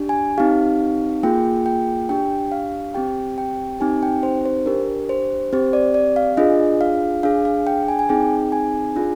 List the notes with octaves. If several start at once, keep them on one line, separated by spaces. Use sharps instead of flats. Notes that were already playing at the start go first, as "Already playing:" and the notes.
Already playing: D4 G4
G#5
C4 D#4 G4 F5
A#3 F4 G#4 G5
G5
D4 G4 G5
F5
C4 G4 G5
G5
C4 D#4 G4 G#5
G5
C5
C5
D4 G4 A#4
C5
C4 G4 C5
D5
D5
F5
D4 F4 G#4 D#5
F5
D4 G#4 F5
F5
G5
G#5
G#5
C4 D#4 G#4 G5
G#5
D4 F4 G#4